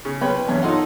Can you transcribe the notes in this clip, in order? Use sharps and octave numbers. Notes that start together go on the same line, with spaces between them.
C#3
C2 B4 C#5 G5 B5
E2 G2 C#5
D#4 F4 A4 C#5 F#5 C6